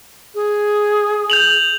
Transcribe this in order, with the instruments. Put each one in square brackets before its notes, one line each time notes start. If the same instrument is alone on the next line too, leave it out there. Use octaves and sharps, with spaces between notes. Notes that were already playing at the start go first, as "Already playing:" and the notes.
[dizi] G#4
[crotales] G6 F7 F#7